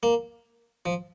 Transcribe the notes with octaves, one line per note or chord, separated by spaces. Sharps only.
A#3
F3